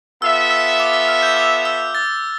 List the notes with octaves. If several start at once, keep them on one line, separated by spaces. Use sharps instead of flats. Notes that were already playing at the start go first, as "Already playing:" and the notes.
B3 F4 A4 E5 E6
E6
D6
E6
F6
G6
D6
E6
A6